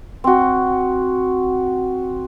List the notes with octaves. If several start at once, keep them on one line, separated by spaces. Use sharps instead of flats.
C4 F#4